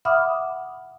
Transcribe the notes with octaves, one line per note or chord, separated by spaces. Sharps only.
E5 F#5 B5 D6 D#6 F6